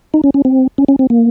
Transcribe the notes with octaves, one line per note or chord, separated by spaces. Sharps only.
D#4
C#4
C#4
C4
C#4
C#4
C4
A#3